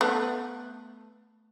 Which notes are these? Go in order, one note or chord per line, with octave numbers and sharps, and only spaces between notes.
A3 B3